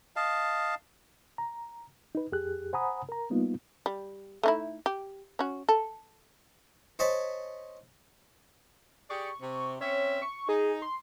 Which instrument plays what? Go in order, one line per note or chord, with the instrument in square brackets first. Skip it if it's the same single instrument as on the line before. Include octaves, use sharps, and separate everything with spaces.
[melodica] D#5 F5 A5
[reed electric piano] A#5
D#4 B4
F2 G4 G#4 F#6
C5 F#5 G#5 A#5 B5 D#6
A#4 A#5
G3 A#3 B3 D#4 F4
[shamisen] G3
A3 D#4 E4
G4
C#4 F#4
A4
[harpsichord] C5 C#5 D#5 G#5 A5 B5
[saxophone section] G4 G#4 D5 [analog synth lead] C#6
[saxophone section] C3
[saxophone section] C4 C#4 E5 [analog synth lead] C#5
[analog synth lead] C#6
[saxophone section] D#4 [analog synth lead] G#4
[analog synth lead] C6